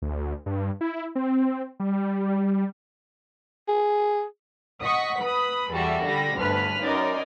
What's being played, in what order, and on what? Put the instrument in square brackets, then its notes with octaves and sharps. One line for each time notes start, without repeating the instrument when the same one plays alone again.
[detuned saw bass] D2
G2
E4
C4
G3
[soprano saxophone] G#4
[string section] D#5 F#5 C#6 D#6 B6
B4 B5 D#6
E2 G3 F#4 A4 E5
D3 G3 B5 A#6
G1 D2 B4 F6 B6
F#2 D#4 A#4 D5 D#5